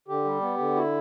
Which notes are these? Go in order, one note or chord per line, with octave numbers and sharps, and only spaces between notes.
D3 G4
G3
B3
D3
E4 F#4